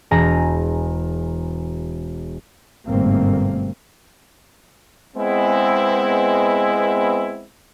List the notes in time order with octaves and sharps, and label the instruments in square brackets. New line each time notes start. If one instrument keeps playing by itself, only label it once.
[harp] E1 G#4 A#5
[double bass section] G1 G#2 B2 A3 A#3 C4
[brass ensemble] G#3 B3 C4 E4